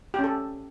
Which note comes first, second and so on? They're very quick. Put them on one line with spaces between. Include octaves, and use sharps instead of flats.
G4 C#4 A4